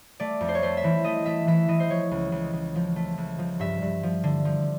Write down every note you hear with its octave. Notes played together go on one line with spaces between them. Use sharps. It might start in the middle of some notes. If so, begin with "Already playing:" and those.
A3 D5
F2
C5
C#5
A3 C5
E5
E3
A3 D#5
A3 E5
E3 E5
E3 D#5
C5
F3 C#5
C#2
C#2
C#2
F3
A3
C#2
F3
G2 E5
G2
F3
D3
F3